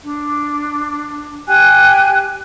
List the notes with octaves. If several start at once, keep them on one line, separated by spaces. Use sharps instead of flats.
D4
G4 G5 G#5 F#6